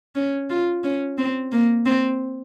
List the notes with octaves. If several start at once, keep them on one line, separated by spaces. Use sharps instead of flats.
C#4
F4
C#4
C4
A#3
C4